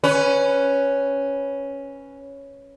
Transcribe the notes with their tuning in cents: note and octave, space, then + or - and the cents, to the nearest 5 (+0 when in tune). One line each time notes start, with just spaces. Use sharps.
C#4 +0 B4 +0